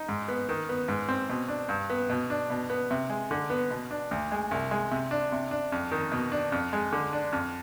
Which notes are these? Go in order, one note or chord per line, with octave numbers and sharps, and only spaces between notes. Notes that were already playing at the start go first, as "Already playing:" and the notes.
Already playing: D#4
G#2
B3
D#3
B3
G#2
C4
B2
D4
G2
B3
B2
D4
B2
B3
C3
G#3
D3
B3
B2
D4
D2
G#3
C2
G#3
C3
D4
C3
D4
F2
D#3
B2
D4
F2
G#3
D3
D4
F2